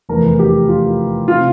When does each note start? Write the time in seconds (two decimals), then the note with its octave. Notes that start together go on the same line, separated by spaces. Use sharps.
0.09 F1 E2 E3 A#4
0.39 G4
0.68 F4
1.28 C3 F4